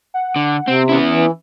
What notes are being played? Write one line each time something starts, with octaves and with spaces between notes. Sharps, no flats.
F#5
D3
C3 C4
B3 C#4 E4
E3